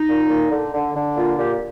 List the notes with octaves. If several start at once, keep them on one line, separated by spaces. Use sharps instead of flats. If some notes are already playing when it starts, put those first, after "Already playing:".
Already playing: D#4
A#2
A#2
D3
D3
D3
A#2 F4
A#2 G4